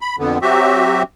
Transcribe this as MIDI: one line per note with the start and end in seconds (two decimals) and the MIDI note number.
0.01 0.16 83
0.19 0.38 41
0.19 0.38 50
0.19 0.38 59
0.42 1.03 54
0.42 1.03 60
0.42 1.03 66
0.42 1.03 67
0.42 1.03 76